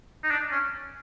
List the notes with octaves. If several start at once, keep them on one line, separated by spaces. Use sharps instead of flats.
D#4
D4
C#4